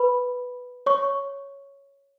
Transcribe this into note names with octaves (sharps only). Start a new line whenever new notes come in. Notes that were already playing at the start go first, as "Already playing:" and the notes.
Already playing: B4 B5
C#5 C#6